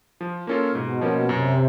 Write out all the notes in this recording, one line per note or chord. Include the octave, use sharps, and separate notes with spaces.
F3
A#3 C#4 F4 A4
G#2 B2
F3 A#3 C#4
F#2 C3